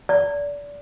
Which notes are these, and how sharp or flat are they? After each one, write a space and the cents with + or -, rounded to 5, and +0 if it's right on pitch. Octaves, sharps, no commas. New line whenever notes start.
D5 -30